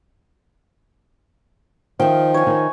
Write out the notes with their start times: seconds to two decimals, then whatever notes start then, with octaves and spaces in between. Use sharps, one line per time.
2.00 D#3 F3 E5 G5
2.34 C#5 G#5
2.47 D#3